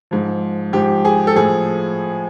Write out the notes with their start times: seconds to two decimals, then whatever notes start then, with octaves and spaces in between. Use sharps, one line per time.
0.11 G#2 F3
0.73 G#2 F3 G4
1.05 G#4
1.27 A4
1.36 A2 F3 G#4